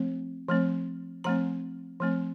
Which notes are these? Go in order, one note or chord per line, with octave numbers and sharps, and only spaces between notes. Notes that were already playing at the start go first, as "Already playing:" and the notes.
Already playing: F3 A3 C4
F3 A3 C4
F3 A3 C4 A#5
F3 A3 C4